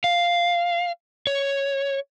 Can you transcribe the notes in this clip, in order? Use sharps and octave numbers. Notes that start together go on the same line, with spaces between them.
F5
C#5